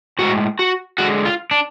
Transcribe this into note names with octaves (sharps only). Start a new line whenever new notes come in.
A2 G#3 F#4
F#4
D3 G#3 F#4
F4
D4